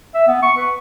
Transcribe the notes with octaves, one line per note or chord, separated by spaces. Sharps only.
E5
B3
C#6
B4